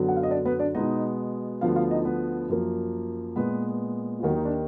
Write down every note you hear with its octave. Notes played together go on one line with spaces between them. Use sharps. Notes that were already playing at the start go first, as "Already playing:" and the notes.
Already playing: F#2 D3 F#3 B3
F#5
F5
D#5
D4 D5
B3 B4
D4 D5
B2 G#3 B3 D#4 D#5
D2 D3 F3 B3 F4 F5
F4 F5
D#4 D#5
B3 B4
F#2 F3 A#3
A#2 G#3 B3 B4
F4
D#2 D#3 F#3 A#3 F#4
D#4
D4